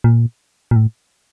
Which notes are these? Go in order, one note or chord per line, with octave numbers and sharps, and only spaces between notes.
A#2
A#2
A2